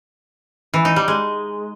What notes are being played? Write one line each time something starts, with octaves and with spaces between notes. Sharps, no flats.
E3
D#4
G3
G#3